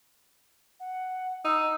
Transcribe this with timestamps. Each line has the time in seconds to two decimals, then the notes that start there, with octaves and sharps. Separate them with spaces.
0.80 F#5
1.45 D#4 E6